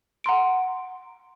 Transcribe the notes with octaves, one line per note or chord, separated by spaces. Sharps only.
F#5 A#5 C6 D7